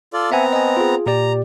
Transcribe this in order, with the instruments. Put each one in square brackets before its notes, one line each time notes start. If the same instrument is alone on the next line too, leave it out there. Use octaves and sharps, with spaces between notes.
[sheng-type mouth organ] F4 A4 D5
[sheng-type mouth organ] B3 C4 A#5 [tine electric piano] E5 F#5 G#5
[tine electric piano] D#5 G#5
F4 G#4
[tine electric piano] A#2 G4 D5 [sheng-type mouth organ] A#5